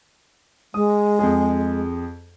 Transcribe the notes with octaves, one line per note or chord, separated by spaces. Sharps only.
G#3 D#6
F2 G#4